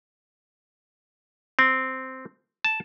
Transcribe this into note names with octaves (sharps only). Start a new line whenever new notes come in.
C4
A5